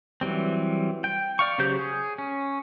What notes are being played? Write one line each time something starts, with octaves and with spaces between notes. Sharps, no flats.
E3 F#3 G3 C4
G5
D5 F5 C#6
C#3 F#3 G4 C5 G6
G#4
C#4